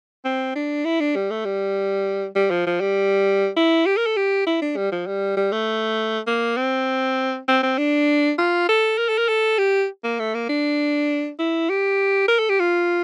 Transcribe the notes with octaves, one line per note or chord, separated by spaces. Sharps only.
C4
D4
E4
D4
G3
A3
G3
G3
F3
F3
G3
E4
G4
A#4
A4
G4
E4
D4
G3
F3
G3
G3
A3
A#3
C4
C4
C4
D4
F4
A4
A#4
A4
A#4
A4
G4
A#3
A3
A#3
D4
E4
G4
A#4
A4
G4
F4